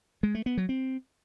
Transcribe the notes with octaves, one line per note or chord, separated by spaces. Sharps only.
G#3
A3
B3
F#3
C4